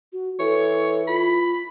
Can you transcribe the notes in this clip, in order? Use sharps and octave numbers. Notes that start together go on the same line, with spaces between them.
F#4
E3 A4 C#5
F4 B5